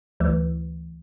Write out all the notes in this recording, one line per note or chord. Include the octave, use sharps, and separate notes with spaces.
D2 E3